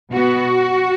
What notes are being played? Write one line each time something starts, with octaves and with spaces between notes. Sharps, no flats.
B2 B3 F#4